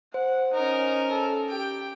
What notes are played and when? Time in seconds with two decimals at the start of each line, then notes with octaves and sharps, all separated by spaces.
0.14 C5 F#5
0.54 C#4 D#4 A#4
1.10 A4
1.49 G4 G5